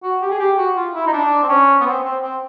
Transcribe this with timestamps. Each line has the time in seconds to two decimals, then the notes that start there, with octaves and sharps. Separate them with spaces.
0.03 F#4
0.22 G4
0.31 G#4
0.39 G4
0.58 F#4
0.76 F4
0.94 E4
1.07 D#4
1.13 D4
1.43 C4
1.49 C#4
1.80 B3
1.86 C4
2.04 C4
2.22 C4